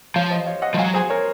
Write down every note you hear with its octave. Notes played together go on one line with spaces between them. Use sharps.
F3 C#5 F5
C5 D#5
C#5 F5
D#5 F#5
F3
F#3 F5 G#5
G#4 C5
A#4 C#5